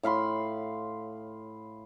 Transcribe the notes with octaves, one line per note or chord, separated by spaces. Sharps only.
A2 F5 B5 C6